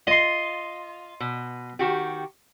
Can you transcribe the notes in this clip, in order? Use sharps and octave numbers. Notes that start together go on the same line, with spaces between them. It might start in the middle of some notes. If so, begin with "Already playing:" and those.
F4 D#5 C6
B2
D#3 F#4 G4